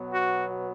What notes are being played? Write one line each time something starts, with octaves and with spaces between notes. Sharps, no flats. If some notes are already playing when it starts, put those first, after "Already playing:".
Already playing: B2 F#3 B3
F#4